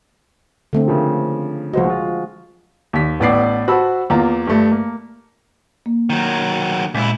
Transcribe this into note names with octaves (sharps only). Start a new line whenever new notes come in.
D3 A3 C4
C#3 F3 A#3
C#2 F3 F#4 C5 D#5
G#3 F4
D#2 B6
A1 A2 B3 D5 D6 C7
F#4 C5 A5 B5 E6
E2 A#3 F4 A#5
G2 A3
A#3
A#3
D#3 F#3
C#2 A#2 G#3 E4